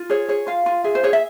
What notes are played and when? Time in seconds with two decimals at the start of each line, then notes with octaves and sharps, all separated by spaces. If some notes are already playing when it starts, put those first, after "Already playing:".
Already playing: F4
0.09 G#4 C#5
0.29 G#4 C#5
0.47 F4 F5
0.66 F4
0.84 G#4 E5
0.95 C5
1.03 G#4 C#5
1.13 E5